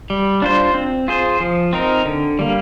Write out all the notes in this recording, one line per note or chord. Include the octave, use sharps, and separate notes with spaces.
G3
D4 F4 C5
C4
F4 G#4 C5
F3
C4 D#4 A#4
D3
G3 A#3